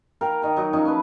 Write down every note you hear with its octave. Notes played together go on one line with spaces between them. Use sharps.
A#4 F5 G5
D#3 A#5
F#3 D#4
F3 C#4 D#4 A5
C#4 E4 B4